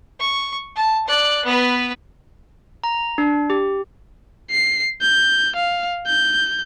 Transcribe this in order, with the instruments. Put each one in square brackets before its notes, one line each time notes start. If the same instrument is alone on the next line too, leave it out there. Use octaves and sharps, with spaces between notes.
[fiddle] C#6
A5
D5 F#6
B3 B4
[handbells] A#5
D4
G4
[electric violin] C7
G6
F5
G6